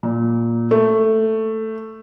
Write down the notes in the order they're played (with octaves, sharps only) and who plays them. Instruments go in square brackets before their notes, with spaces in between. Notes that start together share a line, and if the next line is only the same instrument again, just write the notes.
[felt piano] A#2
A3